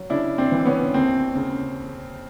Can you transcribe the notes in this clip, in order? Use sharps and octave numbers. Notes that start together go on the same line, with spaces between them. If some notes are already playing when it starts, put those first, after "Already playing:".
Already playing: F#3
C#3 D4 E4
C4 D4
E3
B3 C#4
D#2 C4
C#3